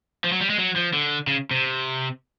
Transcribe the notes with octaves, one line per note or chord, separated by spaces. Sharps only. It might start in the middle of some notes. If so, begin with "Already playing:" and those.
F3
F#3
G3
G#3
F#3
F3
D3
C#3
C3